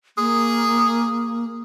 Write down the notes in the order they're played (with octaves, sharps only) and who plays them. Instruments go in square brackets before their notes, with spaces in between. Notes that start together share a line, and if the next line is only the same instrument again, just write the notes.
[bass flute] A#3 [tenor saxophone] G#4